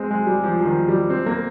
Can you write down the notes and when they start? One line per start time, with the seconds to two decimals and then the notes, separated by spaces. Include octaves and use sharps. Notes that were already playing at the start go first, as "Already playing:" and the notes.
Already playing: G#3 C4
0.11 G#3
0.27 G3
0.44 F3
0.59 F3
0.65 D#3
0.88 G3
1.10 C4
1.26 A#3